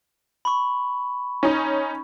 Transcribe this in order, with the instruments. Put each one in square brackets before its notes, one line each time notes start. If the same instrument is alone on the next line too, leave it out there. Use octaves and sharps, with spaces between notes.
[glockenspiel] B5 C#6
[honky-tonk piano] C#4 D#4